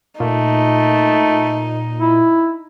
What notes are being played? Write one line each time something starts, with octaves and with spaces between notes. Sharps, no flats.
A#2 A3 D#4
E4